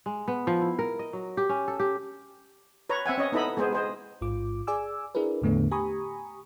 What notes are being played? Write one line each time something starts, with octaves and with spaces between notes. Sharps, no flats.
G#3
B3
F3
E4
A#4
D#5
F#3
G4
C#4
A4
G4
B4 C#5 A#5
C4 E5 F#5 G#5
C#4 C#5 D#5
B3 D#4 E4 A4 D#5 B5
G#3 B3 G#4 C5
G#4 C5 D#5
A1 G#2 F4 D6
G#4 D5 G#5 D6 E6
D4 E4 G#4 A#4 B4
E2 A2 D3 A3 B3
G4 G#5 A#5 B5 C#6 D#6